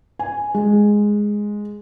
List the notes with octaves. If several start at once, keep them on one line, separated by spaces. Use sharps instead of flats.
G#5
G#3